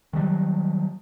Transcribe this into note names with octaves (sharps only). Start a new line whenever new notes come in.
D#3 F#3 G3